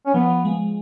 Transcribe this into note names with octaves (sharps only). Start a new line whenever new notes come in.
C#4
F3 B3
F3
F3 G#3